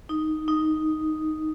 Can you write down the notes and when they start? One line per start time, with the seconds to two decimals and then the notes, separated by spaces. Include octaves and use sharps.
0.09 D#4
0.48 D#4